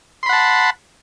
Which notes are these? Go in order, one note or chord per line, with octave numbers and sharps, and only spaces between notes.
F#5 A5 B5 C6